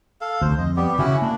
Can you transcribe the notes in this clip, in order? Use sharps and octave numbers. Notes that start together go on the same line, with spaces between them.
A4 F5
D2 C5
F2 D#5
G3 B3 G4
C#3 C#4 E4 F#4
A#3 D4